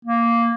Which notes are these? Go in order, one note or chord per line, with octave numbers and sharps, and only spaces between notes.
A#3